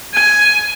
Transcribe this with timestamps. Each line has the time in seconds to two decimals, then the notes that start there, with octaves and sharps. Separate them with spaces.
0.14 G#5